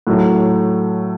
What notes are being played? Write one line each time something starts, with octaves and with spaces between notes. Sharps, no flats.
A2 F#3 A3